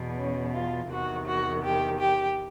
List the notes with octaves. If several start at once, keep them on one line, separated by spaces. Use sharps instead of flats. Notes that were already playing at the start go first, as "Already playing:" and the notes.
Already playing: E2 B2
C#4
F4
E2 C3 D#3 F#4
F#4
G4
G4